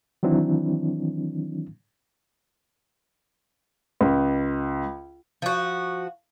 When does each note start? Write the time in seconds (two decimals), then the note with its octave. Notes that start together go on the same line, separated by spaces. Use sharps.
0.23 D#3 E3 F#3 C4 D4 E4
4.01 C#2
5.42 F3 F#4